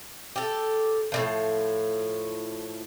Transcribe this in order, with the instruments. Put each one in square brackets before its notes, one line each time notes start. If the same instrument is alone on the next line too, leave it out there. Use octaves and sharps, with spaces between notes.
[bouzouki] G4 A4
A2 D3 F3